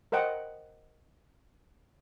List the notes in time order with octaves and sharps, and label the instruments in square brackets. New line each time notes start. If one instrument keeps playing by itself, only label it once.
[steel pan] A#4 C5 D#5 F#5 G5